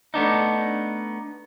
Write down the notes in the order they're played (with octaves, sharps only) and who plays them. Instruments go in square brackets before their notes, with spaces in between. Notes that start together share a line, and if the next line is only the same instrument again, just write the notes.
[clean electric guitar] A3 B3 D4 D#4